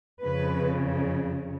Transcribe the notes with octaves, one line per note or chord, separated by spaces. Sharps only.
F2 C#3 B4